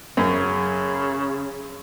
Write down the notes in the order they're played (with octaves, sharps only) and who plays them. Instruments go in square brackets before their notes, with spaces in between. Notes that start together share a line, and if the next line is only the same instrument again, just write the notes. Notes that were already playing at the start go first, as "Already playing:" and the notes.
[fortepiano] F#2 [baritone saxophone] C#3